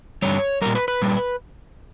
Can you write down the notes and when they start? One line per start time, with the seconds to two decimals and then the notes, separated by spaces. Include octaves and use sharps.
0.22 G2 D3 G3 C#5
0.62 A#2 G3 A#4
0.75 B4
0.88 B4
1.02 A#2 G3